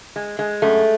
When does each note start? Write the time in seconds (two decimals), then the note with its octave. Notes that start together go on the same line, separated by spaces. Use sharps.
0.16 G#3
0.39 G#3
0.62 F#2 A3